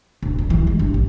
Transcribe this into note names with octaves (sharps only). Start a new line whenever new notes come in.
D1
F2
E3
G#3
G2
A#1